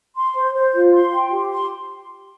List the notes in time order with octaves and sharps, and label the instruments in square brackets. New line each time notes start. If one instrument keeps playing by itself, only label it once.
[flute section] C6
C5
C5
F4
C6
G5
G4
C6